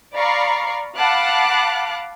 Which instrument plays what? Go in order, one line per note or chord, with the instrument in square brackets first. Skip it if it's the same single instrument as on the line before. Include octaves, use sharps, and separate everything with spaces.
[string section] D5 F5 A#5 B5 C#6 C7
F5 F#5 A5 B5 D6 F#6